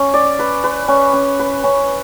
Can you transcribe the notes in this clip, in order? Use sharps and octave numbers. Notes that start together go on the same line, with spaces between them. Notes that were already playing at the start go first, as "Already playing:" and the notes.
Already playing: C#4
D5
B4
B4
C#4
C#4
B4
C#4